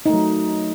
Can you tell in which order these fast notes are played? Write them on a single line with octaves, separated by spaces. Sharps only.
D#4 A3 F#3